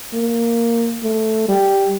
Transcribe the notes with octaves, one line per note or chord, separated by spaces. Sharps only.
A#3
A3
G3